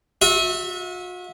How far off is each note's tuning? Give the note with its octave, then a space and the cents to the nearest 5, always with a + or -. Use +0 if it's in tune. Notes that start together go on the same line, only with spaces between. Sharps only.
F#4 -45 E5 -15